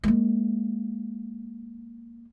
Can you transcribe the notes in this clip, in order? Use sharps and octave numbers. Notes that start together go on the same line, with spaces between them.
G#3 A#3